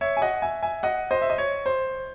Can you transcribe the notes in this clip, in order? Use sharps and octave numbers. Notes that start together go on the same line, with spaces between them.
C#5 E5
G#5
D#5 F#5
E5 G#5
E5 G#5
D#5 F#5
C5 D#5
E5
D#5
C#5
C5